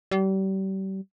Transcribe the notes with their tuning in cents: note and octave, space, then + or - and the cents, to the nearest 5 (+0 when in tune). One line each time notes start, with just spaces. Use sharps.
G3 -35